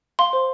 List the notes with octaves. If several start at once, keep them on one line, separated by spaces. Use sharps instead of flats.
F5 C6
C5